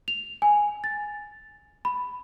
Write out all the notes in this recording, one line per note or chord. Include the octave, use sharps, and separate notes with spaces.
F7
G#5
A6
B5